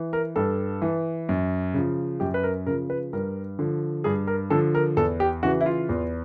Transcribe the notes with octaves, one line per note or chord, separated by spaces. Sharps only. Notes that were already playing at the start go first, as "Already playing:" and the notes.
Already playing: E3
A#4
G2 A4
E3
F#2
C#3 F3
F#2 G4
B4
A#4
C#3 F3 A#4
B4
G2 A#4
D3 F3
G2 G#4
A#4
D3 F3 A4
A#4
E2 A4
G4
C#3 E3 F#4
E4
F4
E2